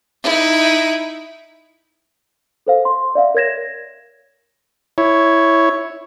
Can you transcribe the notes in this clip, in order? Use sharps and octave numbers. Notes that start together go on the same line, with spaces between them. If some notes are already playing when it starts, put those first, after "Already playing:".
D#4 E4
A4 C5 F5
C6
D5 E5 F5
A#4 C#5 G#6 A#6 E7
E4 C#5